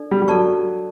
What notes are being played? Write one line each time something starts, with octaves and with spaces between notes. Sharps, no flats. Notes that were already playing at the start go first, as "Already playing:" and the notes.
Already playing: D4 A4 D5
G3
G3
F#3 A4 D5 A5 C#6